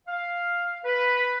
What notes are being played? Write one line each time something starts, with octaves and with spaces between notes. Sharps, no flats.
F5
B4